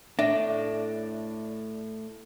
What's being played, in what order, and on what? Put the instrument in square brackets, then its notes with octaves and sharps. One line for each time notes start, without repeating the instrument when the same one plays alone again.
[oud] A2 [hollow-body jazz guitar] D4 [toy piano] E5